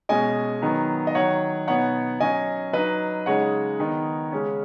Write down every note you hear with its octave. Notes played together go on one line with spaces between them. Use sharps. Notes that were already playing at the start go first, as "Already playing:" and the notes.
B2 G#3 C#4 D#5 G#5
D#3 F#3 B3 D#4
D#5
D#3 F#3 D#4 C#5 F#5
B2 B3 D#4 C#5 F#5
F#3 C#4 D#5 G#5
F#3 D#4 B4 D#5
C#3 G#3 D#4 C#5 F#5
D#3 B3 D#4
C#3 G#3 C#4